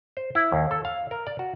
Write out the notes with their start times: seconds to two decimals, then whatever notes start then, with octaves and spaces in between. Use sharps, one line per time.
0.17 C5
0.35 E4
0.52 D#2
0.71 A4
0.85 F5
1.11 A#4
1.27 D5
1.39 F#4